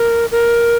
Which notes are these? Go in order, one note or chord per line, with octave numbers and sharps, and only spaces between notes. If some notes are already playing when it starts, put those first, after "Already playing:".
Already playing: A#4
A#4